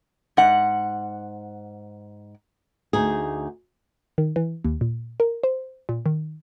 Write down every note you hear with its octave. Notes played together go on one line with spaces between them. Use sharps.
G#2 F#5
D2 D#4 G#4
D#3
E3
D#2
A#2
A#4
C5
A#2
D#3